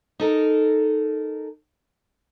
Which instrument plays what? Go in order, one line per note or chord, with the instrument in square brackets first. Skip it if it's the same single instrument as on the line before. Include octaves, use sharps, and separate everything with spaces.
[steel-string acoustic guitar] D#4 A4 A#4